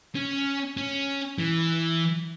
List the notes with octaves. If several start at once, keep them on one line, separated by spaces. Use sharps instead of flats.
C#4
C#4
E3